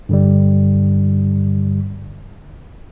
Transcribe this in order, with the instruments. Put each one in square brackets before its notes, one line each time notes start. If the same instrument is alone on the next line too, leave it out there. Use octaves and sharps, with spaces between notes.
[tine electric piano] G2 D3 G3